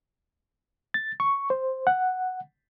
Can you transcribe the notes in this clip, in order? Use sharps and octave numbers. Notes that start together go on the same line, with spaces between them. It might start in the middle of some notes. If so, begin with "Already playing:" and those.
A6
C#6
C5
F#5